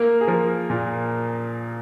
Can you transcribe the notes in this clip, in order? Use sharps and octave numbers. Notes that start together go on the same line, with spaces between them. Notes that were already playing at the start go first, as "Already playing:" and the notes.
Already playing: A#3 A#4
G#4
F3 A#4
A#2